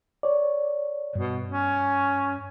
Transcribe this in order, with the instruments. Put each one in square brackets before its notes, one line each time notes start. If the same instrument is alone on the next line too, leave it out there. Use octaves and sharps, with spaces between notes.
[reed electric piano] C#5 D5
[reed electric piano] G2 [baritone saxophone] B2
[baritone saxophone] C#4